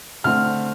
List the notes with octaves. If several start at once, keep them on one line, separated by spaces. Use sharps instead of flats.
D3 A3 C4 F6